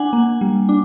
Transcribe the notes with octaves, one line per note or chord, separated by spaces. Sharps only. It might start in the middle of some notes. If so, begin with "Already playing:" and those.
Already playing: D4 F#5 G#5
A#3
G3
D4